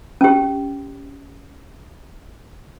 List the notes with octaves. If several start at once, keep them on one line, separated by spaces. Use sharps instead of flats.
C#4 G4